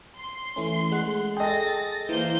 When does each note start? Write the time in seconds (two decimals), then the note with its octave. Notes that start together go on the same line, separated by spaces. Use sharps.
0.18 C6
0.56 E3 A3 C#4
0.92 G#3 F#5
1.37 G#4 A4 D#5 G5 A6 A#6
2.09 E3 A#3 C5 G6